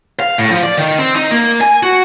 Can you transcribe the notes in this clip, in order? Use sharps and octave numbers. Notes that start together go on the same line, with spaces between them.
F5
A2
F3
D5
D#3
C4
D#4
A#3
G#5
F#4